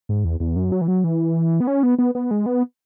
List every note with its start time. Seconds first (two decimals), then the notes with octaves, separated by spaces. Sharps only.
0.09 G#2
0.25 E2
0.40 E2
0.56 F#2
0.72 F#3
0.81 E3
0.88 F#3
1.04 E3
1.60 B3
1.67 C#4
1.83 B3
1.99 B3
2.15 B3
2.31 G#3
2.46 B3